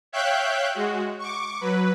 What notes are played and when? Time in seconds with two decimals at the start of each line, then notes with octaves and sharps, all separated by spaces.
0.12 C#5 E5 F5 G5 F#6 G6
0.75 G#3 F#4
1.18 C#6 D6
1.60 F#3 B4